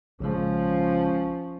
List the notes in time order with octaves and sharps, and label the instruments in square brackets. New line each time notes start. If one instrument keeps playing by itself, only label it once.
[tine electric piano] A#1 C#3 G#3 [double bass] F3 C#4